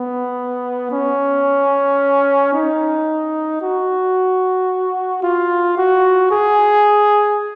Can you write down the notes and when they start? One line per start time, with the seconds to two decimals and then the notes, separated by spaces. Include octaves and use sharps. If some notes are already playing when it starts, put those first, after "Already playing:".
Already playing: B3
0.91 C#4
2.53 D#4
3.61 F#4
5.23 F4
5.77 F#4
6.31 G#4